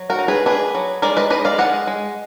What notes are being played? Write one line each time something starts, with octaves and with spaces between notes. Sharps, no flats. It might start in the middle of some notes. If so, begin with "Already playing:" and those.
Already playing: F#3
F#4 A#4
D#4
G#4 B4
D4 G#4 B4
F#3
G#3 A#4 D5
B4 D#5
G#3 B4 D#5
D5 F5
G#3 D#5 F#5
G#3